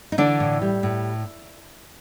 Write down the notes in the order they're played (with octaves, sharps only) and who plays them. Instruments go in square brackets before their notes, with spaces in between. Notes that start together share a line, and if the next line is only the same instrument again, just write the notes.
[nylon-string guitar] D#4
D3 E3 D4
A2
G3
A2